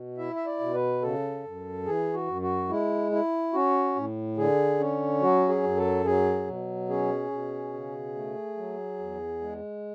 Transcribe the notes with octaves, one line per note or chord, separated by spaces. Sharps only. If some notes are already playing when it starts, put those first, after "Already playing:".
Already playing: B2
E4 E5
E5
D5
B2
B4
C#3 A4
F#2
E3 G#4
F#4
F#2
F#4
G#3 E4
E4
C#4 F#4
A2
D3 G#4
C#4
F#3 F#4
G#4
F#2
A4
F#3 G#4
B2
C#4 G#4
B2
C#3
A3
F#3
E2
G#3